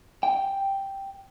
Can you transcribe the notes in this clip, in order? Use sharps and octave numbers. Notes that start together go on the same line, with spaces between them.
G5